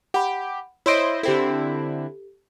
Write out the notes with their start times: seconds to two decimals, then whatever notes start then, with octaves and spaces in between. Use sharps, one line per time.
0.14 G4 F#5 B5
0.86 E4 C5 C#5 D#5 C6 D7
1.23 D3 C4 E4 G4 A4